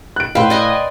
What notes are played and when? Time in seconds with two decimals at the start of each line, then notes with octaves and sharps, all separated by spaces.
0.16 F#6 D7
0.35 A2 B4 C5 F5
0.50 D5 D#5 G#5